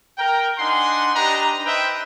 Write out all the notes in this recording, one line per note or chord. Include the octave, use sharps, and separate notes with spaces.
A#4 G5
D4 D#4 F#5 G#5 C6
D4 D#4 G4 B4 D#5 A#5
B4 C5 D#5 E5 G5